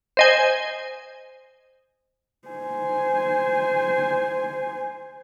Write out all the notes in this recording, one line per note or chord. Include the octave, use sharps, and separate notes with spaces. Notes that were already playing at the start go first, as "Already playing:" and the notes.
C5 D#5 G#5
C5 G#5